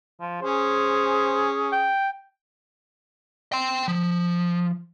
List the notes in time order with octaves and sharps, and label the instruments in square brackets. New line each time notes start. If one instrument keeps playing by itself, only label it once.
[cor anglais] F3
[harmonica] C#4 [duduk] G#4 [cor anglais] C5
[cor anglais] G5
[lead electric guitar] G5 C6
F3